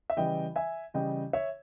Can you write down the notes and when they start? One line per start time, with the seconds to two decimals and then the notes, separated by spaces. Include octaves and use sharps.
0.10 E5
0.17 C#3 E3 G3 D#5 G5
0.56 E5 G#5
0.94 C#3 E3 G3 D#5 G5
1.33 C#5 E5